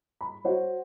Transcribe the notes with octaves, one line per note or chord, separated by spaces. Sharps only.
B5
F#4 C5 C#5